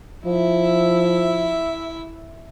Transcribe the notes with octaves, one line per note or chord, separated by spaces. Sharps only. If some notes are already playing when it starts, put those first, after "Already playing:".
F3 E4 E5